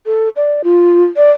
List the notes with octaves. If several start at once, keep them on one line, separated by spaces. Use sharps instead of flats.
A4
D5
F4
D5